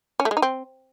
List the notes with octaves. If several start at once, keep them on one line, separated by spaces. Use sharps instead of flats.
C#4
A3
G#3
D#4
C4